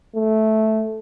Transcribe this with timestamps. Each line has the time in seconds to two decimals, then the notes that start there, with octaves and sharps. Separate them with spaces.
0.16 A3